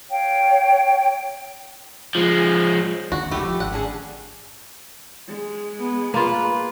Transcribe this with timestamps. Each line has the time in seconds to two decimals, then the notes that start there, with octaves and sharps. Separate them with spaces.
0.10 C#5 F5 G5
2.15 F3 G#3
3.12 D#2 D3 F#4
3.31 F1 C#2 A2 A3 E4 G4
3.44 F3
3.60 G#1 F#5
3.72 C#4 D4 G#4
5.27 G#3
5.79 B3
6.14 A#3 F4 B4